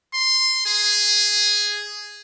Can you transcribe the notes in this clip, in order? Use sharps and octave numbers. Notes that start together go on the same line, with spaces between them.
C6
G#4